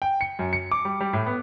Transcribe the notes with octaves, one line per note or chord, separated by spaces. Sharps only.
G5
C#7
F#2
C#7
D6
G3
G3
A2
B3